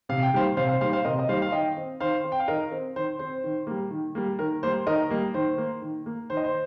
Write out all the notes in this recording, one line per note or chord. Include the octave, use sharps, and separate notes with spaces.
C3 F5
G5
D#3 G3 A#3 C5 F5
C3 C5 F5
C5 F5
D#3 G3 A#3 C5 F5
C5 F5
C3 A#4 D#5
D#5
D#3 G3 A#3 C5 F5
F5
D#3 D#5 G5
C4
D#3 C5 F5
C4
G5
F5
D#3 A#4 D#5
C4
D#3 C5
C4 C5
D#3
G3 A#3
D#3
G3 A#3
D#3 A#4
G3 A#3 C5
D#3 A#4 D#5
G3 A#3
D#3 C5
A#3
D#3
A#3
D#3 C5
D#5
C5